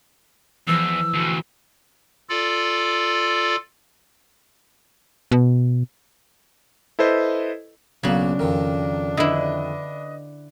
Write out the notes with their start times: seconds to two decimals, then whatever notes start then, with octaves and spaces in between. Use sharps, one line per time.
0.68 E2 E3 F3 E6
1.13 D2 B2
2.29 F4 A4 D5
5.32 B2
6.99 E4 A4 B4 C5 D#5
8.03 B1 C#3 A#3 D4 F#4
8.39 F2 D#3 A#4
9.17 D3 E4 B4 D#5